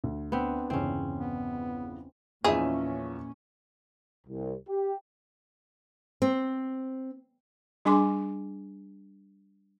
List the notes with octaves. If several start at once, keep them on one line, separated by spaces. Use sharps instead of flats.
D2
B3 C4 D4
G1 E2 C#3 C4 C#4
B3
E2 A#2 F3 C#4 D#4 E4 G#4 E5
C2
G4
C4
G3 D4 G#4 G#5 C6 D6